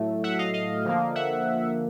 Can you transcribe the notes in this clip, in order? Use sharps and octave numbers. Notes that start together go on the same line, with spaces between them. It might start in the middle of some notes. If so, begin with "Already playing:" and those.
Already playing: A2 F#3 A3
E5 F#5
D#5 F5
D#5 F5
D3 F3 A#3
E5 F#5